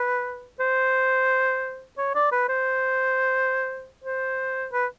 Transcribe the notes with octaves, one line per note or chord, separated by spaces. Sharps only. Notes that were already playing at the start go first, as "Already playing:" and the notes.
Already playing: B4
C5
C#5
D5
B4
C5
C5
B4